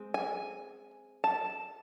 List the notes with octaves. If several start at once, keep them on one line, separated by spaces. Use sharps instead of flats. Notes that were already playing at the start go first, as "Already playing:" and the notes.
Already playing: G#3 C4
G#5
A5